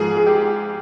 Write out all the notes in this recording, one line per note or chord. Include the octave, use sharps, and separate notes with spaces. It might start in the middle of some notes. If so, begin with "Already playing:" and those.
Already playing: G#2 F3 G#4
G#4
G4